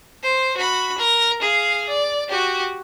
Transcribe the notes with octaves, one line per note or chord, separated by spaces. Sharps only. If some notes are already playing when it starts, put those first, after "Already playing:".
C5
F#4 B5
A#4
G#4 F5
D5
F#4 G4